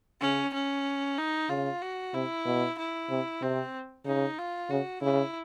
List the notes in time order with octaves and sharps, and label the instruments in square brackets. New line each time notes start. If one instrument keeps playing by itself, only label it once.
[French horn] C#3 [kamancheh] C#4
[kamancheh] C#4
D#4
[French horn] C#3 [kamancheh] F4
[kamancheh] F#4
[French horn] C3 [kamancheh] E4
[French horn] B2
[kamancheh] E4
[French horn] C3
[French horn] C3 [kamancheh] C4
[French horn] C#3 [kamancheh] D#4
[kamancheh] F4
[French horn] C#3 [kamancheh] F#4
[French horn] C#3 [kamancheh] E4